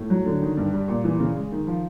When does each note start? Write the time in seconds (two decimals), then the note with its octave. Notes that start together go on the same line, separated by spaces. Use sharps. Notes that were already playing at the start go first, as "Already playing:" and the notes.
Already playing: A2
0.10 F#3
0.25 D3
0.42 D#3
0.57 G2
0.73 G3
0.88 A#2
1.04 E3
1.20 C#3
1.36 G#3
1.52 D#3
1.67 F3